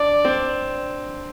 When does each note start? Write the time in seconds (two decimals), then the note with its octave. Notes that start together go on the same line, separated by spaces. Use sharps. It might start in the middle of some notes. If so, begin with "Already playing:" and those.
Already playing: D4 D5
0.25 C4